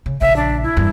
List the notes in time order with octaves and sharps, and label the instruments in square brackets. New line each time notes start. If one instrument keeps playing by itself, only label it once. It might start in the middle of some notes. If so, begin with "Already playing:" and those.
[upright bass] C#3
[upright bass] A#1 C#3 [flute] E5
[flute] D4
E4
[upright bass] E2 G2